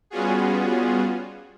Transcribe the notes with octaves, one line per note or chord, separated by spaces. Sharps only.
G3 B3 C#4 F4 F#4 G#4